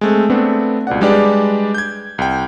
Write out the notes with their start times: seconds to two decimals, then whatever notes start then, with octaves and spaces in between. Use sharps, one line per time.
0.01 G#3 A3 C4
0.30 A3 B3 C4 D4
0.87 C#2 B2 D5 F#5
1.01 G3 G#3 D4 G4 B4 D5
1.75 G6 G#6
2.18 C2 G5